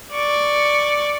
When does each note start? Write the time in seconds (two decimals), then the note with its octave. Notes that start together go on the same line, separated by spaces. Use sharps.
0.12 D5 C#6